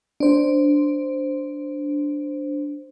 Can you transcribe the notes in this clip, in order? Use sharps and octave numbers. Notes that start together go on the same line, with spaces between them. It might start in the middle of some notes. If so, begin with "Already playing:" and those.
D4 C5